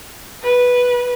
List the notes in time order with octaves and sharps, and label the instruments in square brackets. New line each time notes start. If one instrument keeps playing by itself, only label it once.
[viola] B4